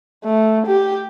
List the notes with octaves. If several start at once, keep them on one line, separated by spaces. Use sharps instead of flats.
A3
G4